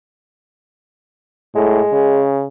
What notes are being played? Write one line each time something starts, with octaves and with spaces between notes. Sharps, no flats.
A2 G#3
C#3